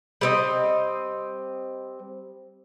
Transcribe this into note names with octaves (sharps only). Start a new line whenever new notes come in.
G3 C4 D#5